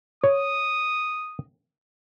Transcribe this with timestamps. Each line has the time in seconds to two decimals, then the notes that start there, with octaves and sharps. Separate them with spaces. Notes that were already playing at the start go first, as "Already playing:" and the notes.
0.24 C#5 D#6